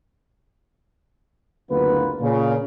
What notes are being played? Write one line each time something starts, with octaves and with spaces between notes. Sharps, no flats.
F#1 D2 A#3 B3 F4 B4
A#2 C#3